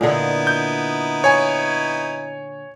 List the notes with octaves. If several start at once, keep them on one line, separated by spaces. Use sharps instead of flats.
A#2 D3 B3 D#4 E4
G6
C#5 G#5